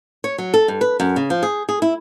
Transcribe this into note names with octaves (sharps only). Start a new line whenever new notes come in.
C#5
F#3
A4
G2
B4
F#2
C#3
F3
G#4
G#4
E4